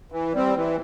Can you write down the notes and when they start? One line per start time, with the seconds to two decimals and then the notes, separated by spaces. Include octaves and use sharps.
0.12 E3
0.33 G3 C4
0.55 E3